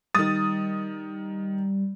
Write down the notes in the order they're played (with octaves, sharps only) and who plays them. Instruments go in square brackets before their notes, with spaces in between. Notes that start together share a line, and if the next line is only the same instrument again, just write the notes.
[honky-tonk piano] D#3 A6 [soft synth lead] G3 [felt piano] D#6